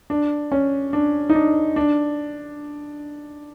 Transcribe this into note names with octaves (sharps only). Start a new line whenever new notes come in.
D4
C#4
D4
D#4
D4
D4